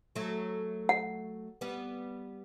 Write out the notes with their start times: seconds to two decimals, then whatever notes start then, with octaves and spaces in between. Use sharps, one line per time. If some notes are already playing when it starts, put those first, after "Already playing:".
0.16 F#3 A3
0.89 F#5
1.61 G3 B3